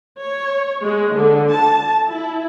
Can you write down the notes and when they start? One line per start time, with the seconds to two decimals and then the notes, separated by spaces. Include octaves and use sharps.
0.19 C#5
0.84 G#3
1.13 D3
1.52 A5
2.07 E4